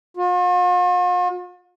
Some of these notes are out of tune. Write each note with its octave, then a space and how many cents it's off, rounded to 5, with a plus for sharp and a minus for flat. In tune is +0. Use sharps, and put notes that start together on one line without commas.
F4 +45